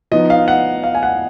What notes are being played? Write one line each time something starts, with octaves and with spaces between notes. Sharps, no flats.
F3 B3 D#4 D#5
F5
F#5
F5
G#5
F#5